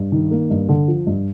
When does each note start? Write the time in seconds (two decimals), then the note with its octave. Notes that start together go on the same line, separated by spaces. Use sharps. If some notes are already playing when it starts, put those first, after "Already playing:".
Already playing: G2
0.12 D#3
0.31 A#3
0.50 G2
0.69 D3
0.88 F3
1.07 G2